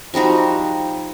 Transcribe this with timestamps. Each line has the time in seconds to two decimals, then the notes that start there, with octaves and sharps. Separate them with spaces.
0.14 F3 G3 D#4 F#4